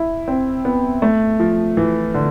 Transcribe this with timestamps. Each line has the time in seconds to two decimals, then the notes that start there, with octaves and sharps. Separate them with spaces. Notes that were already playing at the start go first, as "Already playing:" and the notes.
Already playing: E4
0.28 C4
0.65 B3
1.02 A3
1.40 F3
1.77 E3
2.14 D3